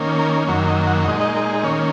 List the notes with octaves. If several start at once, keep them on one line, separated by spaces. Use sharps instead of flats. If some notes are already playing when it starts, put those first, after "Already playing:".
Already playing: D#3 A#3 C#4
A#4
F#2 D#3 F#3 A#3 C#5
D#5
F#5
C#5
A#2 G#3 D#4 D#5
D#5
A#4
G#4
D#3 A#3 C#4 C#5